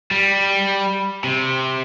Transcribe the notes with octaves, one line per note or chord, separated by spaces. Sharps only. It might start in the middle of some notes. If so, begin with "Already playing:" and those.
G3
C3